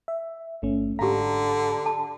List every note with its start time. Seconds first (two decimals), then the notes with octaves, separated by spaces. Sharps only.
0.08 E5
0.62 G1 A3 C#4
0.99 G#2 D3 G4 F5 A#5
1.86 A5